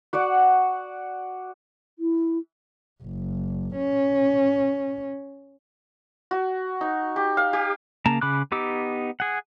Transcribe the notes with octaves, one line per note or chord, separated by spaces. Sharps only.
F#4 D5 F#5 D6
E4
F#1
C#4
F#4
D#4
G4
F5
G4
C#3 A#3 A5 A#5
C#3 B5 D6 F#6
B3 D#4 G4 D6 E6
G#4 F#5